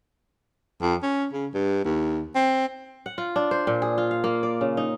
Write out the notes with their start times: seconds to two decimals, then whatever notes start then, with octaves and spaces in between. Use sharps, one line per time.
0.82 F2
1.03 C#4
1.33 C#3
1.54 G2
1.85 D#2
2.35 C4
3.06 F#5
3.18 F4
3.36 D4
3.51 C5
3.67 A#2
3.82 G#4
3.98 F4
4.11 F5
4.24 A#3
4.43 D5
4.61 C#3
4.77 D#4